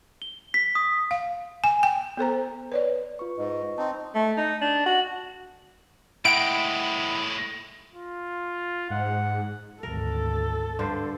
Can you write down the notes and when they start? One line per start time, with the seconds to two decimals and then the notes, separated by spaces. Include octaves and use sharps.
0.22 G7
0.54 B6
0.75 D#6
1.11 F5
1.64 G#5
1.83 G5
2.17 B3 A4 C5 A#5
2.72 B4 C#5 D5
3.19 F4 B4 C#6
3.38 G#2 D#5
3.78 C4 D#4 A5 C6
4.15 A3
4.37 D#4
4.61 D4
4.86 F#4
6.25 A2 G#3 E4 F#5 G5 D7
7.94 F4
8.90 G#2 F#5
9.83 G#1 D2 A4 A#4
10.79 G2 D3 C5